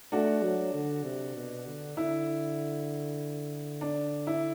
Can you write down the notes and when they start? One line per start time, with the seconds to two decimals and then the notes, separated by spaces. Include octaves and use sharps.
0.12 A3 D4 F#4
0.43 F#3
0.74 D3
1.04 C3
1.35 B2
1.66 D3
1.97 D3 E4
3.81 D4
4.27 E4